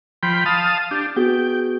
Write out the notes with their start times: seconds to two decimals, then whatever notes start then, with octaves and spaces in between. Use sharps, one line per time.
0.23 F3 G5 B5 C6 C7
0.46 F5 A5 D#6
0.91 D4 G4
1.16 B3 F#4 G#4 G5